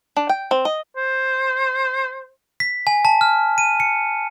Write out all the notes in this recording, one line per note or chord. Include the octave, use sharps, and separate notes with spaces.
D4
G5
C4
D#5
C5
B6
G#5
A5
F6
D#7
C#7